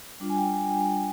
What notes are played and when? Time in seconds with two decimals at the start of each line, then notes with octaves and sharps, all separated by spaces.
0.20 G3 D4 F4
0.30 G#5
0.37 G5
0.54 G#5
0.71 G5
0.87 G#5